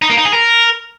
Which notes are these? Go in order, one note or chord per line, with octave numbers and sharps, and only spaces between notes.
D#4
A#3
D#4
G#4
A#4